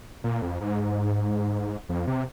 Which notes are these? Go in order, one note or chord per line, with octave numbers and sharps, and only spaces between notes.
A#2
F2
G#2
F2
C3